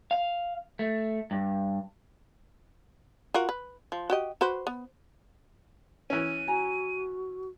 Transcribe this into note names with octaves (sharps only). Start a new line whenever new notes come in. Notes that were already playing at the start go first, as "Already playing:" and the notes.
F5
A3
G2
F4 F#4 A#4
B4
F3
F#4 G4 D#5
F#4 B4 C5
B3
E3 C#4 D#7
F#4 G#5 A#5